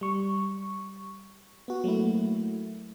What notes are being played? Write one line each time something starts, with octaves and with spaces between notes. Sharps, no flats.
G3 C#6
B3 F#4
F#3 A3 A#3 E4